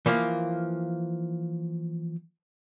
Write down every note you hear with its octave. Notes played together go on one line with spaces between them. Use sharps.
E3 F3 A#3